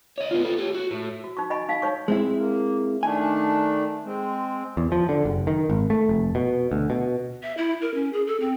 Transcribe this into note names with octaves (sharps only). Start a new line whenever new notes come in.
C#5 D#5
B3 F4
F4 A4
G4 C#5
F#4
A2
F#4
D#4 C#6
D#5 G#5 B5 C#6
D#4 F5
D#4 C#5 C#6
G#3 C4 E4
A#3
D#3 A3 D4 G#5
G#3 C4
E2
F3
D3
F#1
D#3
G#1
A3
F1
B2
D2
B2
E5
E4
A#4
C#4
G#4
A4
C4